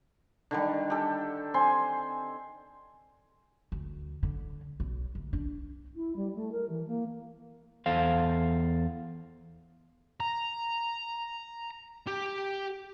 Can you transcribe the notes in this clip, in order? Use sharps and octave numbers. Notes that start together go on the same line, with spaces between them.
D3 D#3 G3
G4 A4
C4 G#5 C6
D2
D3
B1
D2
D4
E4
G3
A3
A#4
E3
A#3
E2 A4 C5 F5
A#5
G4